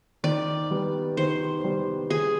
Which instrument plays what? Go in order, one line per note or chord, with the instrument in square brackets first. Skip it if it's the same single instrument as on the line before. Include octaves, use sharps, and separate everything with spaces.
[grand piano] D#3 [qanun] D5
[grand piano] G3 B3
[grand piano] D#3 [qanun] C5
[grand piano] G3 B3
[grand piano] D#3 [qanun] G#4